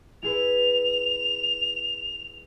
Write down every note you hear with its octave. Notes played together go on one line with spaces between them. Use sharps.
E4 G#4 B4 F7